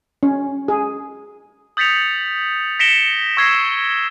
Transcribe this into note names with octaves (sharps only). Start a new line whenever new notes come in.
C#4
G#4
D#6 G6 A6 B6 C#7 F7
A#6 B6 C#7 D7 E7 G7
C#6 E6 G#6 A#6 C7 E7